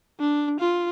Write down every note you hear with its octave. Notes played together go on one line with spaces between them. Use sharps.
D4
F4